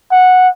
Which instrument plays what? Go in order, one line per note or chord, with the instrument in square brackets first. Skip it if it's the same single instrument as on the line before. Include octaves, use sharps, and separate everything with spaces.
[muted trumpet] F#5